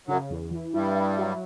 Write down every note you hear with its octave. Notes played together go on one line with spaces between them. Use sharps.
F#2 C#3 F#3
E2
E3
G2 G3 E4
E4
F#3